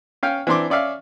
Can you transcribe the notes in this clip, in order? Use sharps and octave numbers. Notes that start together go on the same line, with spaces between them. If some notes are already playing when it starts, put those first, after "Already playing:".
C#4 F5 G5
E3 C4 D4 C6 D6
C#4 D5 E5 F5